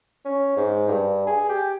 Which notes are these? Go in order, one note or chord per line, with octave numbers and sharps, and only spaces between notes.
C#4
G#2
G2
G#4
G4